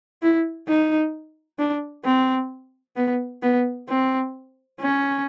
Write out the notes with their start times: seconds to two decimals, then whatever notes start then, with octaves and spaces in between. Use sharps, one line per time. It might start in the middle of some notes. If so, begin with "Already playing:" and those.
0.22 E4
0.68 D#4
1.59 D4
2.05 C4
2.96 B3
3.42 B3
3.89 C4
4.80 C#4